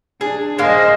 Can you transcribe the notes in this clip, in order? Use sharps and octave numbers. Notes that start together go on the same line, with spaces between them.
D4 G#4
G#3 A#3 C5 D#5